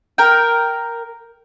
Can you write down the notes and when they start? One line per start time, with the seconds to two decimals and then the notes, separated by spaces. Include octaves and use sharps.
0.18 A#4 G5